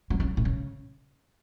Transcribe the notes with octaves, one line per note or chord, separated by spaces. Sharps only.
F#3
C#3
A2
C#3